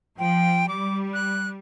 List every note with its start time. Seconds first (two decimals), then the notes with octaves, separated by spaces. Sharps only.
0.19 F3 G5
0.69 G3 D6
1.14 F#6